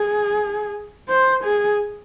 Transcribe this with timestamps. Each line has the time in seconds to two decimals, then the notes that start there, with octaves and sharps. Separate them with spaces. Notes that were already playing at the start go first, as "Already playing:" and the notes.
Already playing: G#4
1.09 C5
1.44 G#4